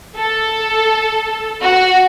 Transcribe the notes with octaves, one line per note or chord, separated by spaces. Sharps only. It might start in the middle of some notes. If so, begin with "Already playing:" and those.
A4
F#4